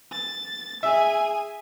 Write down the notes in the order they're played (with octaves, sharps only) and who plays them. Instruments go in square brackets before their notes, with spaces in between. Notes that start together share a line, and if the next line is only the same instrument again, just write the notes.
[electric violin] A6
[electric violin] G#4 G#5 [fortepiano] E5